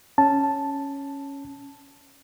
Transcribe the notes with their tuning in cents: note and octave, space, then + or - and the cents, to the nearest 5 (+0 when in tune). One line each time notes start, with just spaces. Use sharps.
C#4 +0 A5 +0